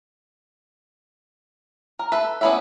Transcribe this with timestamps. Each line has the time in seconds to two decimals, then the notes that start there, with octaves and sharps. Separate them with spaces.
1.99 A#4
2.12 A4 B4 E5
2.41 B3 C#4 E4 D5 E5